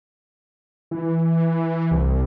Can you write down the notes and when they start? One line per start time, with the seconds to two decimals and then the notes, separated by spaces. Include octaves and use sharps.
0.91 E3
1.91 C2